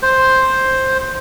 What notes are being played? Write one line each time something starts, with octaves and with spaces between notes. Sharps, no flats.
C5